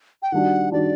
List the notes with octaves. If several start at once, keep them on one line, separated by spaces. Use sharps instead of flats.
G5
D#3 G3 D4 F#4 F#5
D#3 G3 D4 F#4 D5